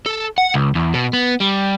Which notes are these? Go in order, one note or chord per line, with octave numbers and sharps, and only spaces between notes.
A4
F#5
C#2
E2
B2
B3
G3